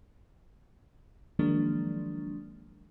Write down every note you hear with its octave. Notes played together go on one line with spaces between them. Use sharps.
D#3 F3 F#3 G#3 A#3 D4